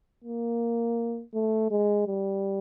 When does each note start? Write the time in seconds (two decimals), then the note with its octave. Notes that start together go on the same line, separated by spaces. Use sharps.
0.24 A#3
1.34 A3
1.71 G#3
2.07 G3